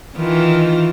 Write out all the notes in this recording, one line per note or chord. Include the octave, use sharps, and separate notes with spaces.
D#3 E3 F4